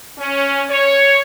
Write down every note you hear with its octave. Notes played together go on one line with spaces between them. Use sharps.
C#4
C#5